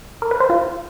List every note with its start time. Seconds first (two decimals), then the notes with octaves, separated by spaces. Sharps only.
0.22 A#4
0.31 B4
0.40 C5
0.50 F4